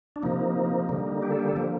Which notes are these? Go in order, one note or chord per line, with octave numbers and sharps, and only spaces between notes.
D4
C3 F3 A#3 D#4
D3 G3 A#3
G4
A4
G4
A4
D3 F3 A#3 G4